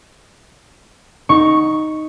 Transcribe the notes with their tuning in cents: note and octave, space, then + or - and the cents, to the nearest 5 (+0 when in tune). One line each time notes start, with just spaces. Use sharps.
D#4 +0 C#6 +0